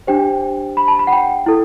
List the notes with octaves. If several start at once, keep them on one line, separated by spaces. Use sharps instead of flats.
D4 G4 C5 G5
B5
A5
B5
F#5
G5
E4 A4